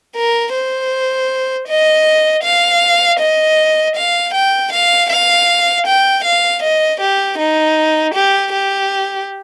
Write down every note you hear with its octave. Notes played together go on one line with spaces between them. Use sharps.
A#4
C5
D#5
F5
D#5
F5
G5
F5
F5
G5
F5
D#5
G4
D#4
G4
G4